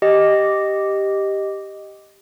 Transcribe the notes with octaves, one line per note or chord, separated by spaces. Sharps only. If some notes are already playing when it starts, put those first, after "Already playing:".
G4 D#5